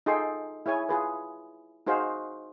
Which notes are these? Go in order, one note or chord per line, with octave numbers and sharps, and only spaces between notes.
D#4 F4 G#4 A4 G5 C6
E4 G#4 C#5 G#5
F4 G#4 B4
D#4 F#4 G#4 C5 F5